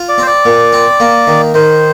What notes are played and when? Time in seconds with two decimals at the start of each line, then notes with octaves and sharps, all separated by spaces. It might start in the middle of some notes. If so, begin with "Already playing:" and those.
Already playing: F4
0.09 D5
0.18 C4 C5
0.27 D5
0.45 A#2
0.73 C4
1.00 A#3
1.27 D#3
1.54 D#3 C5